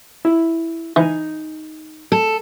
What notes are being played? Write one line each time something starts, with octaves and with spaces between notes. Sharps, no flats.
E4
E3 D#4 G#5
A4